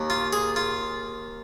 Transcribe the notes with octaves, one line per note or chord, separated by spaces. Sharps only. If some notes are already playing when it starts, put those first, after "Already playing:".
Already playing: D#2 D#3
F4
G#4
F4